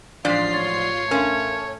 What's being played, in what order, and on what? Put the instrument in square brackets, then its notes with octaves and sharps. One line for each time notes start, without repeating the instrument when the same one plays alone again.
[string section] A1 F4 C7 [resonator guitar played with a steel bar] G#2 F3 D5 [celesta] D4 B6
[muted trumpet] C#5 [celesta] A6
[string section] A3 [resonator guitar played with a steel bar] C#4 [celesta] A#4 F5 C6